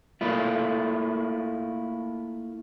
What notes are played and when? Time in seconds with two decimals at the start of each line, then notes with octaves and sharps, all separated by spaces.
0.21 A3 A#3 E4 F4